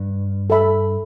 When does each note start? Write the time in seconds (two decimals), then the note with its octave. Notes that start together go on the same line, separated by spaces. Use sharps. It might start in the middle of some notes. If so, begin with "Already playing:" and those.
Already playing: G2
0.50 A4 E5 B5